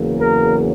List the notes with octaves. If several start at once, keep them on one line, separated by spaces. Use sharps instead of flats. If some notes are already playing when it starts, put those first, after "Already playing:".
Already playing: E2 C#3 F#3 A#3
A#4